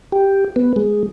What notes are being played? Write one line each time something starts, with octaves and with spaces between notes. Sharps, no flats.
G4
B3
G#3